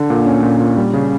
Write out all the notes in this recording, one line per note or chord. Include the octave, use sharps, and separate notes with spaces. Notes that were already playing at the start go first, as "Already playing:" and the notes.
Already playing: D3
A#2
C#4
A#2
A#2
G3
C#3